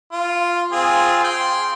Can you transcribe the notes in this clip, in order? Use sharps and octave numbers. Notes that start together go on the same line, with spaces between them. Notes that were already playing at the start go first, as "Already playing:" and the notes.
F4
C4 F4 G#4
G5 C6